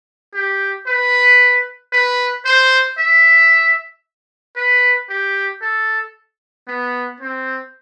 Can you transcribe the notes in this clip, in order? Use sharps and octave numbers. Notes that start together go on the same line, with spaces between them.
G4
B4
B4
C5
E5
B4
G4
A4
B3
C4